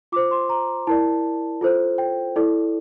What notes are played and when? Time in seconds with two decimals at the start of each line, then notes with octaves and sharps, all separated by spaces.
0.12 F4 D6
0.16 C5
0.31 C6
0.49 A#5
0.87 E4 A#4 D5 A5
1.61 F4 A4 C5
1.98 G5
2.36 E4 A4 D5